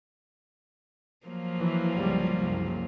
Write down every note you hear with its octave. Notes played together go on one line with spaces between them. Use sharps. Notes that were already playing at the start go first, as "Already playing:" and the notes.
F3 F#3 A#3
E3
G1 C#2 G3
F#1 C2